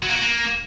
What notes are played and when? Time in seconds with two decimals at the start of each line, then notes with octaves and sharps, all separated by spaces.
0.02 F#3
0.09 A#3
0.15 F#4
0.21 A#3